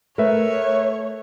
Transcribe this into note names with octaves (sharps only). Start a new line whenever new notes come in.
A3 A#4 B4 C#5 E5